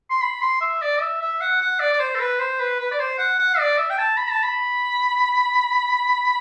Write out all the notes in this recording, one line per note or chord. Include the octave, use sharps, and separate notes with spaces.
C6
B5
C6
E5
D5
E5
E5
F#5
F#5
D5
D5
C5
A4
B4
C5
B4
B4
D5
C5
F#5
F#5
D5
E5
G5
A5
B5
A5
B5